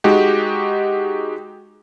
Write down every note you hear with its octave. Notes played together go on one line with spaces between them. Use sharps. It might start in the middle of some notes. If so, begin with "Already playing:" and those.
G#3 D#4 F#4 G4